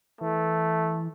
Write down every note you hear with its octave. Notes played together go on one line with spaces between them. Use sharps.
E3 A3